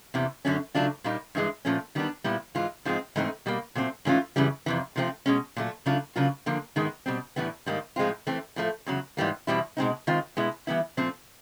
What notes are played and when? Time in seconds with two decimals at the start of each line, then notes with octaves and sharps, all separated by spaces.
0.14 E2 C3 E3
0.45 F#2 D3 F#3 A3 C#4
0.75 C#3 F#3 A3 D4 F4
1.04 A#2 G3 A#3 D#4
1.35 G2 E3 G#3
1.65 A#2 F3 A3 C#4
1.95 D#3 G3 B3 D4
2.24 A#2 G3 B3 E4
2.55 G#2 E3 G#3 F4
2.85 G#2 F3 G#3 C4
3.16 G#2 E3 A3 C4 D#4
3.46 B2 G3 A#3
3.75 A#2 F#3 A3 C4
4.05 G#2 E3 A3 C#4 F4
4.36 F#2 C#3 E3 G3
4.66 F2 C3 E3
4.96 C3 F3 A3 C4
5.26 B2 G#3 C#4
5.56 A#2 F#3 A3
5.86 C#3 F#3 A3 D4 F4
6.16 C#3 F#3 A#3 D4 F4
6.46 D3 F3 A#3
6.76 G#2 D#3 G#3 B3
7.06 B2 G3 C4
7.36 A2 E3 G3 B3
7.66 G#2 D#3 G3 A#3
7.96 A2 F3 G#3 C4 F4
8.27 E3 A3 C4
8.56 A2 F3 A3
8.86 E2 C#3 F#3
9.17 G#2 E3 G3 A#3
9.47 E2 B2 G3 C4 E4
9.77 B2 G#3 C4 D#4
10.07 D#3 G#3 C4 F4
10.37 B2 G#3 B3 E4
10.67 E3 G3 B3 E4
10.97 A#2 F3 A3 C4